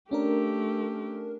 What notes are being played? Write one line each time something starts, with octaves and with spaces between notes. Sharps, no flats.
A3 C#4 D4 G4 A#4